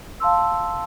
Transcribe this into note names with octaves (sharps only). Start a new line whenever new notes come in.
F5 A5 C6 E6